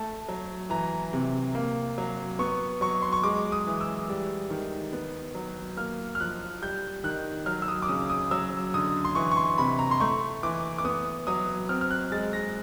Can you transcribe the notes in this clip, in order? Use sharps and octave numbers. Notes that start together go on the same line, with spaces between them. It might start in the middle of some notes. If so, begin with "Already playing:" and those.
Already playing: A3 A5
F#3
E3 A#5
C3
A#3
F#3
B3 C#6
F#3 C#6
C6
C#6
G#3 D6
D#6
E3
E6
G3
D#3
B3
F#3
A#3 F6
F6
F3 F#6
G3 G6
D#3 F#6
F#3 F6
E6
D#6
D6
C#3 D#6
D#6
F#3 E6
D3 D#6
C6
E3 C#6
C#6
C6
C3 B5
A#5
C6
A3 C#6
E3 D6
D6
B3 D#6
F#3 D#6
C4 F6
F6
F#6
G#3 A6
A#6